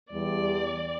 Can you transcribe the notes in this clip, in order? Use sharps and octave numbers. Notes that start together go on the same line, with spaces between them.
E2 G3 D5